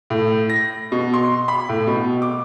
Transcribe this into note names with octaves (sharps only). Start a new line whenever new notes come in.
A2
A#6
B2
C6
B5
A2
B2
D6